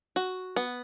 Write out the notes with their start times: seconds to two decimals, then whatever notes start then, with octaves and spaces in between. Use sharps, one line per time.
0.16 F#4
0.56 B3